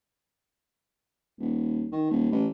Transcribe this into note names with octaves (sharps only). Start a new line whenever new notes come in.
D#1
D#3
D#1
A1